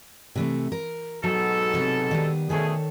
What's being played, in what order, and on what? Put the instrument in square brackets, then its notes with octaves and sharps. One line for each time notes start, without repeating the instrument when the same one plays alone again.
[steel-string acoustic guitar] C3 E3 A3
A#4
[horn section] G#2 B2 A4 [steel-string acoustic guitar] F#3
[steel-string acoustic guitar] C3 F#3
D#3 G3 B3
[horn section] B2 A3 G#4 [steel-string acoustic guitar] D#3 A4 C#5